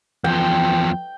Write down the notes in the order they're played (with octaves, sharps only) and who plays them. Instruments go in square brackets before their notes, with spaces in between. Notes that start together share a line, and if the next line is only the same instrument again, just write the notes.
[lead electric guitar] E2 F3 [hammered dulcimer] G5